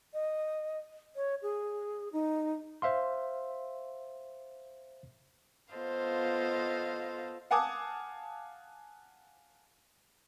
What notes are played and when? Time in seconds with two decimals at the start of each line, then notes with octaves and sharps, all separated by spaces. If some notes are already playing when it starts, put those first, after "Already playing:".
0.14 D#5
1.16 C#5
1.42 G#4
2.13 D#4
2.82 C5 E5 F5 C6
5.74 B3 F4 A4 C5 D#5 F5
7.51 F5 F#5 G#5 A5 D6 D#6